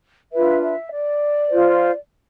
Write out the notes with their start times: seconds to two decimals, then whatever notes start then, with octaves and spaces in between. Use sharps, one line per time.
0.32 D4 F4 B4 E5
0.62 E5
0.91 D5
1.50 F4 C5